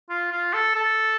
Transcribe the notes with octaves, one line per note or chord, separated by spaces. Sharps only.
F4
F4
A4
A4